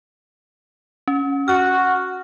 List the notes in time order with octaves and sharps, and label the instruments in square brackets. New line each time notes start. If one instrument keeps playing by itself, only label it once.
[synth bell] C#4
[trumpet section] F#4 [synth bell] F6